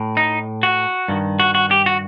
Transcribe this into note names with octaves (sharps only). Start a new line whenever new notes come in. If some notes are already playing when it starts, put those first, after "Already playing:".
Already playing: A2
D#4
F#4
G2 D#3
F#4
F#4
G4
F#4